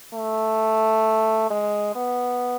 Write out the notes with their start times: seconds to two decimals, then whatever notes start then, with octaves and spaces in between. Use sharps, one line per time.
0.14 A3
1.50 G#3
1.95 B3